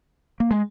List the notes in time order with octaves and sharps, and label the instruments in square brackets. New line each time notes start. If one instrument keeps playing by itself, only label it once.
[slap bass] A#3
G#3